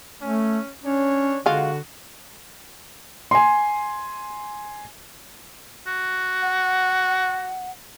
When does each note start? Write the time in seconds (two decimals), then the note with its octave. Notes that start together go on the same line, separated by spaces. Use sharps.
0.22 A3 C#4
0.83 C#4 D4 C#5
1.46 D3 G#3 F4 F#4
3.31 G#5 C6
5.87 F#4
6.42 F#5